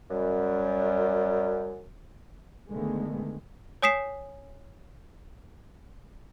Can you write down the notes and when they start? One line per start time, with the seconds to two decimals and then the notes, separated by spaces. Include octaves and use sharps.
0.10 F#2 G3
2.70 D3 D#3 G#3 A3 B3
3.82 C#5 G#5 D#6 B6 C7 E7